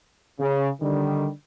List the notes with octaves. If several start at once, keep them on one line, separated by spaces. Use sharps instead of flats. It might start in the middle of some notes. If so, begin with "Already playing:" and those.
C#3
D3 D#3 G3